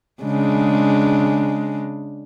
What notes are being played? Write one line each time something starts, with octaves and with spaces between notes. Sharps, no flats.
C#3 G#3 D4